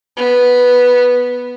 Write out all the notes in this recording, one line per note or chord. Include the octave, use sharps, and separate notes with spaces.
B3